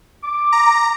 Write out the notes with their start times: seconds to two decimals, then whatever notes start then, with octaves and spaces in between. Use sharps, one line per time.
0.23 D6
0.52 A#5